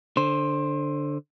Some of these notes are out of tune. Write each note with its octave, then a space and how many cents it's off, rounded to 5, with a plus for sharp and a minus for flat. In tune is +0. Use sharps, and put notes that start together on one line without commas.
D3 +0 C5 +15